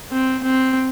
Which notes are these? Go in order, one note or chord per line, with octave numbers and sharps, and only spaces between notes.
C4
C4